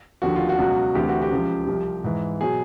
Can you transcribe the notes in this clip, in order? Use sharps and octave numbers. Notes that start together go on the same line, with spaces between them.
D#2 D3 F3 F#4
F4
F#4
C#2 B2 F#3
D2 C3 E3 G4
F#4
G4
C#2 C#3 F3
C2 C3 F3
G#2 E3
B2 F#3 G#4